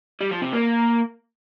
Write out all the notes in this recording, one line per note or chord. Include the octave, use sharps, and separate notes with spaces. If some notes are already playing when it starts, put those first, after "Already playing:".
G3
F3
C3
A#3